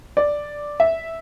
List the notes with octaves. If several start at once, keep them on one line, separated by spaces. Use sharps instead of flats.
D5
E5